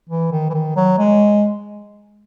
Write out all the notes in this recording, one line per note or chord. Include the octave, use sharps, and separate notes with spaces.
E3
D#3
E3
D#3
F#3
G#3